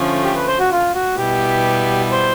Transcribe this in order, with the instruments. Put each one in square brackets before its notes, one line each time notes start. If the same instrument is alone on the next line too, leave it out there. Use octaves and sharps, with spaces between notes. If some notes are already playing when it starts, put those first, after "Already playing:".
Already playing: [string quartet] D3 F3 A3 C#4
[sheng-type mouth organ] G4
B4
C5
F#4
F4
F#4
[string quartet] B2 G3 B3 E4 [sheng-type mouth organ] G4
[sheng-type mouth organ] C5